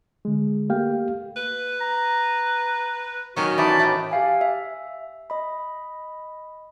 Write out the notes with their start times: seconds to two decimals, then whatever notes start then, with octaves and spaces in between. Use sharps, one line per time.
0.25 D3 G#3
0.69 A3 A#3 G4 F5 G5
1.36 B4
1.81 A#5
3.36 D#3 F#3 C#4 F#4 G4 C#6
3.58 E3 B3 D#4 D5 A5 B5
3.80 A2 A3
4.11 G4 E5 F5 G#5
4.41 E5
5.30 D#5 B5